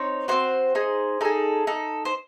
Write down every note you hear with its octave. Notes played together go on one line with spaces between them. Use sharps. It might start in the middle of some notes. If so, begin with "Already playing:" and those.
Already playing: C4 D#4 C#5
C4 D#4 F#4 C5
D#4 G#4
D#4 G#4 A4
D#4 A4
C5